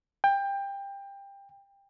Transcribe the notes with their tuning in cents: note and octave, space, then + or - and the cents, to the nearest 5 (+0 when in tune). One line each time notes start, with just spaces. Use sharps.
G5 +20